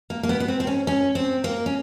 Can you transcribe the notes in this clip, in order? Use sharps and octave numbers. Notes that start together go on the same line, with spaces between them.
A#3
A#3
B3
B3
C4
C4
C#4
C#4
C4
A#3
C#4